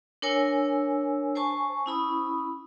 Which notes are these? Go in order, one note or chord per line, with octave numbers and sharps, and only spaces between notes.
D4 A#4 C#5 G#5 E6
C5 G#5 A5 C#6
C#4 E4 B5 D#6